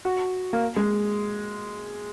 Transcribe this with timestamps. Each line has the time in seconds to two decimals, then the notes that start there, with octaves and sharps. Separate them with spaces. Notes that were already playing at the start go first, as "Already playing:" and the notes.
0.05 F#4
0.53 A#3
0.76 G#3